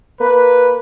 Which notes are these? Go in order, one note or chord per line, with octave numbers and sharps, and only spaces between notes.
A#3 B4